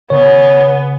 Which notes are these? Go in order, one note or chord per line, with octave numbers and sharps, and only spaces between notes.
C#3 B3 C#5